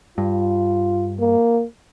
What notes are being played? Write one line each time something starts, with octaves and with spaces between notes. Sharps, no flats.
G2 F4
A#3